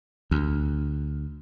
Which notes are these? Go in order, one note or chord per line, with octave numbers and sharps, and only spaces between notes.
D2